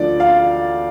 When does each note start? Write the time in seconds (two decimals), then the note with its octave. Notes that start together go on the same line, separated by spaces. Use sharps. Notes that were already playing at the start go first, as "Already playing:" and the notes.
Already playing: D2 D3 F3 D5
0.20 F5